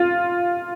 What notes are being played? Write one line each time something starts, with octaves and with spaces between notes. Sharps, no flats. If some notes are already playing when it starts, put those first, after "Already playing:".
Already playing: F4